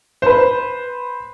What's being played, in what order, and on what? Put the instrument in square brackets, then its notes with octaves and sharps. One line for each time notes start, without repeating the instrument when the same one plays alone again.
[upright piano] B4 C5